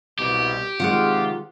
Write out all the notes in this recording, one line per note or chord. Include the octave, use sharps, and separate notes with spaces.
C2 B2 G4
C3 D#3 G#3 F4 F#5 D#6 F#6